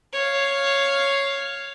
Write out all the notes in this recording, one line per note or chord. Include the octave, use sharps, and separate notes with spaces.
C#5 F5